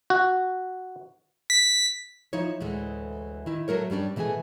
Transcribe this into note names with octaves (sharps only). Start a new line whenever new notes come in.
F#4
B6
F3 D#4 E4 C#5
D2 A2 E3 G#3
D#3 E4
F#3 A3 A#4 C#5
G2 G3 C#4 D4
B2 E3 A3 G#4 G#5